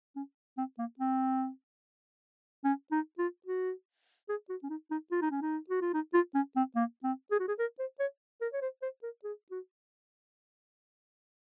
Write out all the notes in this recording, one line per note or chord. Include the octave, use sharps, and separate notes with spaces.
C#4
C4
A#3
C4
C#4
D#4
F4
F#4
G#4
F#4
C#4
D#4
D#4
F4
D#4
C#4
D#4
F#4
F4
D#4
F4
C#4
C4
A#3
C4
G#4
F#4
G#4
A#4
C5
C#5
A#4
C#5
C5
C5
A#4
G#4
F#4